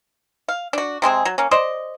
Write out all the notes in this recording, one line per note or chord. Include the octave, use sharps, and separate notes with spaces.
F5
D4 F#4
C3 G#3 C4 G#4
F#3
A#3 C#4
C5 D5 D#5